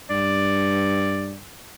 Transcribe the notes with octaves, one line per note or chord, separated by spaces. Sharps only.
G2 D5